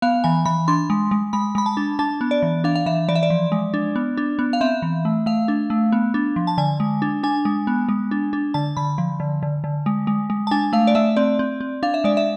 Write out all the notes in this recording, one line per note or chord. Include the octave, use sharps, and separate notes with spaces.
B3 F5
E3 G#5
E3 B5
D4 C6
G#3
G#3
G#3 B5
G#3 B5
A5
D4
D4 A5
B3
D5
E3
D4 F5
F5
E3 E5
E3 D5
E5
D5
F3
G#3
D4
B3
D4
B3
F5
C4 E5
E3
A3
A3 F5
D4
A3
B3
D4
F3
A5
D3 G#5
G#3
D4
D4 G#5
G#3
B3
G#3
D4
D4
D3 A5
D3 B5
F3
D3
D3
D3
G#3
G#3
G#3
A5
D4 G#5
A3 F5
D5
A3 E5
C4 D5
C4
C4
D4 F5
E5
G#3 D5
E5